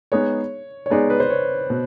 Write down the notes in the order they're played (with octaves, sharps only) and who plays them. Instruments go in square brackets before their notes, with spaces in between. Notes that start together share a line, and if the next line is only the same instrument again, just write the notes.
[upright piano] G#3 B3 D#4 G#4 [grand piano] C#5
[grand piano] C#5
[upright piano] G#3 B3 D#4 G#4 [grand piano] D5
[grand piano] B4
C5
C#5
[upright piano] B2